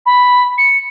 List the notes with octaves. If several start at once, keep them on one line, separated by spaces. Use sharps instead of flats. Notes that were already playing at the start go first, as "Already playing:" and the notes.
B5
C#7